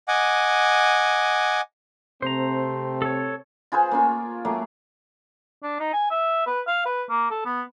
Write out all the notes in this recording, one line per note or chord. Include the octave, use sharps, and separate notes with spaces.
D#5 F#5 G#5 D6
C3 A3 C4 C5 A#5
A4 C#5
F4 G#4 B4 C5
A#3 C#4 F4
F#3 A3 A#3
D4
D#4
G#5
E5
B4
F5
B4
A#3
A4
B3